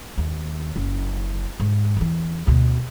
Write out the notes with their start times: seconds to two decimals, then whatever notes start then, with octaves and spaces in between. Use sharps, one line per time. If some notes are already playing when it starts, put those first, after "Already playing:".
0.18 D#2
0.76 F#1
1.60 G#2
1.97 E2 E3
2.47 D2 B2